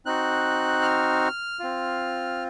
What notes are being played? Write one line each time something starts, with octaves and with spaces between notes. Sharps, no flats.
C4 D#4 F#4 F#6
F6
C4 F4